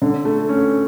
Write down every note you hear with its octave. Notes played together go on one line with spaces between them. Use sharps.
D3
A3
C#4